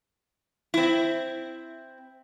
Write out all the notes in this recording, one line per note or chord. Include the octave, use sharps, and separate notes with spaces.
C4 E4